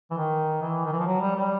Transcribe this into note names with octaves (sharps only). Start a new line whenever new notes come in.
E3
D#3
E3
D#3
E3
F3
F#3
G3
G3